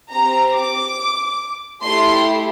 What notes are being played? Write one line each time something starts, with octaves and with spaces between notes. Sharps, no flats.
C4 G4 A#5
D6
A3 E4 G4 C6